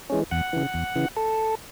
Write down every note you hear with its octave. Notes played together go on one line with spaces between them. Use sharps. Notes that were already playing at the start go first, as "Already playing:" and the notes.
E3 G#3 C#4
E2 F#5
C#3 E3
E2
C#3 E3
A4